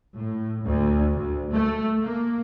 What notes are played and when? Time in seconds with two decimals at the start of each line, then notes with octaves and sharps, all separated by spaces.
0.16 A2
0.66 D2
1.14 D2
1.51 A3
1.99 A#3